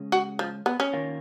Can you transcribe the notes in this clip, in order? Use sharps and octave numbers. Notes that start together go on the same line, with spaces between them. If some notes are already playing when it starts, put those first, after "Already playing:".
Already playing: C#3 G#3 C#4
F#4
F3
B3
C#4
D#3 A#3 F4 A#4 C#5